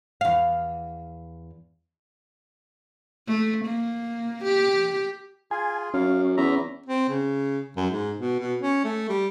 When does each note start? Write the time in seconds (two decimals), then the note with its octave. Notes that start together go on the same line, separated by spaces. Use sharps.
0.21 E2 F5
3.27 A3
3.65 A#3
4.44 G4
5.51 F4 G#4 G#5
5.94 F#2 C#4 F5
6.37 E2 E5 A#5
6.86 C4
7.09 C#3
7.77 F#2
7.91 G#2
8.19 B2
8.40 B2
8.62 C#4
8.84 A3
9.09 G3